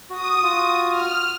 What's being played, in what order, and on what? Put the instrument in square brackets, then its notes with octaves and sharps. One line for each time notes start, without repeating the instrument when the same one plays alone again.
[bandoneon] F#4 [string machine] D#6
[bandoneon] F4 F#4
[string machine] F6